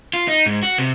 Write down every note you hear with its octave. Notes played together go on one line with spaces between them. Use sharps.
F4
D#4
G#2
F#4
C3